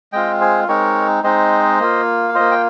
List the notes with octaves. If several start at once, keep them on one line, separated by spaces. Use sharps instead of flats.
G#3 C4 F4 D#5 G5
G#4 C5
G#3 C4 D#4 A#4 C#5
G#3 C4 D#4 C5 D#5
A#3 F4
F5
A#3 F4 C5 D#5
G5